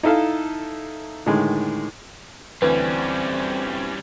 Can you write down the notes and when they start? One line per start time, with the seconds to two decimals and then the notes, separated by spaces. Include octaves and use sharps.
0.03 D#4 E4 A4 F5
1.26 A2 D3 D#3 G#3
2.62 D2 E3 G3 C4 C#4 B4